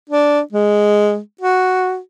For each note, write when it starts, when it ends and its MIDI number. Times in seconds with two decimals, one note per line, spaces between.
0.10 0.40 62
0.52 1.18 56
1.41 1.99 66